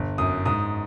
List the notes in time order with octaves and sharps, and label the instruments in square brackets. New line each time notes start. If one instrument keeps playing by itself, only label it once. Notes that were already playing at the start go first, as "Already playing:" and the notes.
Already playing: [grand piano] G1
F#2 D#6
G#2 D#6